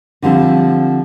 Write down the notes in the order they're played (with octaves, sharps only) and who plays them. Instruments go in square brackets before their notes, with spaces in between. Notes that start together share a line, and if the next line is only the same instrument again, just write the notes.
[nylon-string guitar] D3 F3 G3 C4